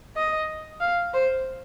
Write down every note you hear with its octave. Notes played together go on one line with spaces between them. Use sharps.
D#5
F5
C5